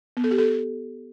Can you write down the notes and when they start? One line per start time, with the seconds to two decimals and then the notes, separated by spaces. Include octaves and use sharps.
0.17 B3
0.24 A4
0.31 G4
0.38 A4